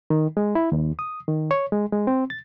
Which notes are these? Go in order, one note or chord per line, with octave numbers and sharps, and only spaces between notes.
D#3
G#3
E4
D#2
D#6
D#3
C#5
G#3
G#3
C4
A6